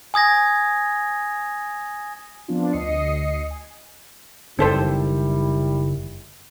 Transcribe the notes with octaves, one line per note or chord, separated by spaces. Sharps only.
G#5 D#6 G#6 A#6
F3 B3 C4 D4 F4
D2 D#5 D#6 C7 C#7
G#5
F#1 D#3 G3 C4 E4 A4 C5